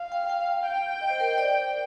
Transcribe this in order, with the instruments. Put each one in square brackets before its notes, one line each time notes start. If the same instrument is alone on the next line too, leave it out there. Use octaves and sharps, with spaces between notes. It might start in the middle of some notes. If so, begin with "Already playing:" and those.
Already playing: [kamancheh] F5
[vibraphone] G5
G5
[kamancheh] G5
[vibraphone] D#5
C5
A#4
C5
D5